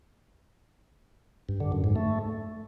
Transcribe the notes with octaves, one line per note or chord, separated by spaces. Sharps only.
G2
D3
F#2
G#2
A3